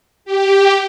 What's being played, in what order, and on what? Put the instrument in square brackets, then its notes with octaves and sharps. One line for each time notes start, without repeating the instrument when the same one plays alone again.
[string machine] G4